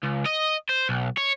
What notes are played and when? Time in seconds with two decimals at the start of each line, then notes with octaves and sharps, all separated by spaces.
0.03 C#2
0.26 D#5
0.69 C5
0.89 B1
1.17 C#5